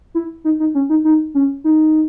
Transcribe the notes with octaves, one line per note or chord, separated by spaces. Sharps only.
E4
D#4
D#4
C#4
D#4
D#4
C#4
D#4